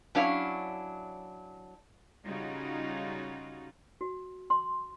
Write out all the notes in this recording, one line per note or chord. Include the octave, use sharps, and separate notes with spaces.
F#3 C#4 D4 E4 F5
C#3 G3 C#4 D#4 F4 F#4
F#4
C6